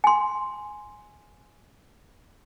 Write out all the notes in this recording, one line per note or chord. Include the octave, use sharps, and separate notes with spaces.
G#5 C6